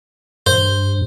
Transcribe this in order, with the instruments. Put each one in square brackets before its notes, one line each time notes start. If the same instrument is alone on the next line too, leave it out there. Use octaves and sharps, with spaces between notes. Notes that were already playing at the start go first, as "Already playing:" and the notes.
[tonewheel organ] G2 [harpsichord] C5